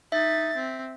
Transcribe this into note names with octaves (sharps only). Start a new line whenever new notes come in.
D#4 E5 A6
C4